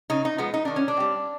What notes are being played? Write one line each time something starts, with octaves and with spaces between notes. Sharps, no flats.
C#3 D#4
D#4
F3 G#3 B3
D#4
D#3 D4
C#4
D4
G3 C4